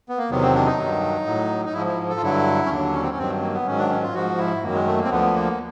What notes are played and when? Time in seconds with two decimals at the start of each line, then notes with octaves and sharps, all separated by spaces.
0.09 B3
0.18 A#3
0.30 E2 C3 D#3 F#3 B3
0.41 C4
0.54 D4
0.65 D#4
0.78 G2 D#3 F#3
1.26 A2 F#3
1.65 D#4
1.73 G#2 F3 E4
1.86 E4
2.10 A4
2.17 F4
2.22 G2 D3 F#3 E4
2.66 C#4
2.70 D#2 D3 F#3 D4
2.93 C#4
3.02 C4
3.10 C#4
3.17 G2 D#3 F#3 C4
3.42 A#3
3.54 B3
3.66 G#2 D#3 F#3 C#4
3.78 D4
3.90 C#4
4.02 F4
4.14 G#2 F3 F#4
4.38 E4
4.63 F#2 D#3 F#3 A#3
4.74 G#3
4.87 A3
4.98 A#3
5.04 C4
5.10 D2 D3 F3 B3
5.34 A#3